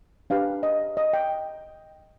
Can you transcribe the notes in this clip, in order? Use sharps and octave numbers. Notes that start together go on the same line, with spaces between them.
D4 G4 B4 F5
D#5
D#5
G5